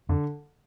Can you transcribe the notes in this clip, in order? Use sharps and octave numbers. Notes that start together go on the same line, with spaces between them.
F2 D3